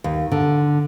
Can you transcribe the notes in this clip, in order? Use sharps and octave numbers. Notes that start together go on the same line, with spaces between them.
D#2
D3